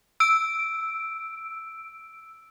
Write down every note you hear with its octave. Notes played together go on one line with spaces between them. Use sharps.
E6 D7